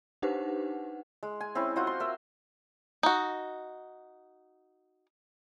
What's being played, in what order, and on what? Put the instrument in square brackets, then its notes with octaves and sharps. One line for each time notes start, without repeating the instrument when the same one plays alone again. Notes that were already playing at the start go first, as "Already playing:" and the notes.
[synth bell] D4 D#4 G4 B4 C5 F#5
[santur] G#3
G#5
C4 C#4 E4
F4 F#4 C5 D#5
C6
A#4 E5
[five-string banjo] D#4 F#4